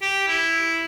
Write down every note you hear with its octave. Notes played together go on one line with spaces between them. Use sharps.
G4
E4